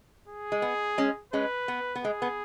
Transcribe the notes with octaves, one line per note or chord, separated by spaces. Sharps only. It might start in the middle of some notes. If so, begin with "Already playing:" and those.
G#4
G#3
B3
G#3 C#4
G#3 C#4 B4
B3
B3
G#3 G#4
B3